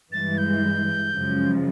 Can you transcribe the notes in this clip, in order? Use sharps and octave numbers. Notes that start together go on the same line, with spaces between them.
G2 E3 G#3 A6
G6
F#2 C#3 F3 G#3